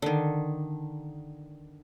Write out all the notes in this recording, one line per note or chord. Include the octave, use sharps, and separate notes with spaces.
D3 D#3